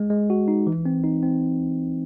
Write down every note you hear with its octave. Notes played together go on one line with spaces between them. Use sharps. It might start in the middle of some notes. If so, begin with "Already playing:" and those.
Already playing: G#3
G#3
F#4
D#4
E3
C4
D#4
C4